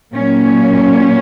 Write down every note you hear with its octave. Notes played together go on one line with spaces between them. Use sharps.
A#2 F#3 A#3 C#4